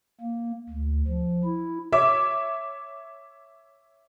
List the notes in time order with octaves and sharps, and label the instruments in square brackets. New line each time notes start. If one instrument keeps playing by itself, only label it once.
[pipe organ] A#3
D2
F3
E4
[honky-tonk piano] C#5 E5 D6